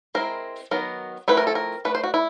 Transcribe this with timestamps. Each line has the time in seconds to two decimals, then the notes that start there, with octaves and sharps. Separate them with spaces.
0.15 G#3 C4 E4 A#4
0.71 D#3 F#3 B3 A#4
1.28 F3 A3 C4 E4 B4
1.37 A#4
1.47 A4
1.55 A#4
1.85 A3 D4 B4
1.95 C5
2.03 F#4
2.14 E4